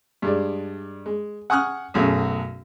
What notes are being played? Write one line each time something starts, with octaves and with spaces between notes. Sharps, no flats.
G2 G#3 D5
G#3
F#5 G#5 C#6 D#6 F6 F#6
B1 F#2 A3 F#4 G#4